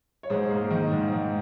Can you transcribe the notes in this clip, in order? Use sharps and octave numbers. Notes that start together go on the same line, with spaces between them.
C#5
G#2 G#4 C5
A#3
D#3
G#2
G#2